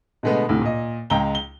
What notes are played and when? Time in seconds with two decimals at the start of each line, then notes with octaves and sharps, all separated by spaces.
0.23 B2 D3 G#3 A3 B3
0.49 D2 A2 C3
0.62 A#2 D#5
1.10 C#2 G#3 G5 A#5 G7
1.35 G7